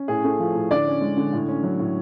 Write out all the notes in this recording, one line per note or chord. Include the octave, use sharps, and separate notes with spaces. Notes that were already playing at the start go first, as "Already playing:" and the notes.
Already playing: C#4
A2 G#4
A3
F3
A2
D3 D5
C#4
G#3
D3
A2
C#4
F#3
A2